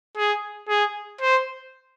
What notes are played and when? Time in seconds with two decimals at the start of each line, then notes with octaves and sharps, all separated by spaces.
0.17 G#4
0.69 G#4
1.21 C5